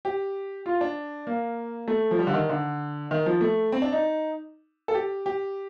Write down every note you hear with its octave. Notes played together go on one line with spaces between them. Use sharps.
G4
F4
D4
A#3
A3
F3
G3
D3
D#3
D3
D#3
F3
A3
C4
D4
D#4
A4
G4
G4